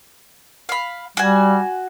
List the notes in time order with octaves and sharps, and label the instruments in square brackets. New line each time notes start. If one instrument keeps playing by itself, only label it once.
[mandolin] F5 B5
[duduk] G3 [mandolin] F#4 G#5